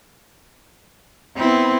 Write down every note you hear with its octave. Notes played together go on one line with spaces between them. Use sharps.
B3 C4 E4